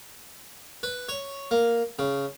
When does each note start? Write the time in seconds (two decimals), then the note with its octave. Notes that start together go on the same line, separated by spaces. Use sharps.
0.83 B4
1.09 C#5
1.51 A#3
1.99 C#3